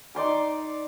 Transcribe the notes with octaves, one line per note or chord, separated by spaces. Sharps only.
D#4 D5 C6 D6